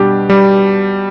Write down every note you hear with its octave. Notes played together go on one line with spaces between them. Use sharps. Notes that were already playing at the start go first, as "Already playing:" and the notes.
Already playing: B2 G3 D4 G4
G3